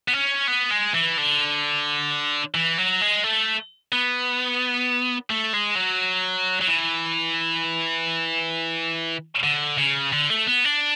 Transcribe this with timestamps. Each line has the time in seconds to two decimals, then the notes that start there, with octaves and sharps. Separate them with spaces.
0.08 B3
0.14 C#4
0.48 B3
0.71 G#3
0.94 E3
1.17 D3
2.55 E3
2.78 F#3
3.01 G#3
3.24 A3
3.93 B3
5.30 A3
5.54 G#3
5.76 F#3
6.61 F#3
6.68 E3
9.44 D3
9.78 C#3
10.13 D3
10.30 A3
10.47 B3
10.64 D4